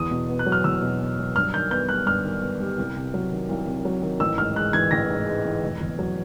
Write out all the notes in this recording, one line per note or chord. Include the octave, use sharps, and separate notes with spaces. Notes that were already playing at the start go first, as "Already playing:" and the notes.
Already playing: E2 D#6
B2
B3
F#6
F#3
F6
E2 E6
B2
B3
F#3
G2 F6
D#3 G6
B3 G6
G3 F#6
G2 F6
D#3
B3
G3
C2
C3
F#3
D#3
C2
C3
F#3
D#3
A1 E6
G#2 F6
G#3 F#6
E3 G#6
A1 A#6
G#2
G#3
E3
F1
E2
F#3